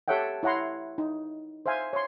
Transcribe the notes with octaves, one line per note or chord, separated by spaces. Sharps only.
G4 A4 C#5 E5 F#5 G5
E4 C#5 F#5 A#5 C6
D#4
C5 E5 F5 G#5
C#5 C6